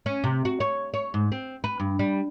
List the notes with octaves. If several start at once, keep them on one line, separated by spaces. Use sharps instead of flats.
C#4
C3
F#4
C#5
C#5
G#2
C4
B4
G2
G3